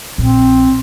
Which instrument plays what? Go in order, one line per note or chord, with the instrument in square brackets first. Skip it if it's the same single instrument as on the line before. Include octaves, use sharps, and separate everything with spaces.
[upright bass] A#1 [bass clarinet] C4